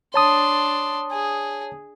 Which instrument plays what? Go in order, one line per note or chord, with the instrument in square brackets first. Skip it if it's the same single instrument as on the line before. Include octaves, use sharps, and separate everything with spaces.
[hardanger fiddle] D4 C6 [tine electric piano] C#5 A5 D#6
[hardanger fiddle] G#4